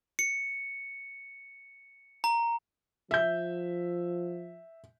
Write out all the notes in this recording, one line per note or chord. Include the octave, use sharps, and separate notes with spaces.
C#7
A#5
F3 E5 G6